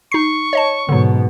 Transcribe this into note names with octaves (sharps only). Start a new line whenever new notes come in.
D#4 C#6 C7
C#5 D#5 A5
G#2 B2 D3 F#3